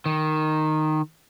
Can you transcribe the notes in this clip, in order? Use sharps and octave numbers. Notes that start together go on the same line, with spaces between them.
D#3